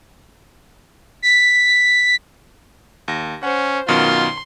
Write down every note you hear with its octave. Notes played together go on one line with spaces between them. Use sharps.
B6
D#2 A#6
C#4 C5 F#5
F#2 B2 D#3 F4 C6